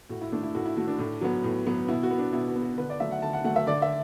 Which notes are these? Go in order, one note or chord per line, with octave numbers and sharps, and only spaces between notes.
A2 F#4
E4
A3 D4
E4
A2 F#4
E4
A3 F#4
D4
A2
F#3 B3
A2
F#3 B3
B2 E4
F#4
B3
D4
B2 E4
F#4
B3
F#4
D3 B4
D5
F#3 A3 E5
F#5
D3 A5
F#5
F#3 A3 F#5
E5
D3 D5
E5